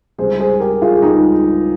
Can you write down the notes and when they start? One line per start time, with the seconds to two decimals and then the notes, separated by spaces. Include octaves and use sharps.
0.18 C#2 C3 G3 G#4 C5
0.40 G#4 C5
0.60 G4 A#4
0.82 F4 G#4
0.95 G#4
1.02 C#2 C3 G3 D#4 G4